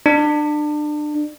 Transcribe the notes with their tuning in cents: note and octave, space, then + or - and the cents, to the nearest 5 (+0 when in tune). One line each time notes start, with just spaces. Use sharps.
D4 +30